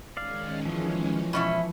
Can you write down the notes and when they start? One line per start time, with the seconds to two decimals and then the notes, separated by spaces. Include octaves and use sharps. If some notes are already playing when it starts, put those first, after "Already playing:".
0.17 D#3 G#3 C#4 D5 F5
0.65 E3 F3
1.33 B2 C#4 E4